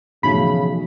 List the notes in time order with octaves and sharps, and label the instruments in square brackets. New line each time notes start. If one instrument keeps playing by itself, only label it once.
[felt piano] B1 [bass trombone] C#3 [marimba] E3 F3 A3 [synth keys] B5